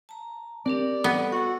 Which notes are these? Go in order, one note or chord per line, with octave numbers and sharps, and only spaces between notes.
A5 A#5
C4 D4 G4 A#4 D5
G3 B3 A4 D#5
F#4 F#5 E6